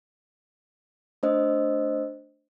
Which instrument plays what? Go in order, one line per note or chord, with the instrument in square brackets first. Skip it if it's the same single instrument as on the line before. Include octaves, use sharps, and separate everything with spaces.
[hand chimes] A3 D4 C5 D#5 E6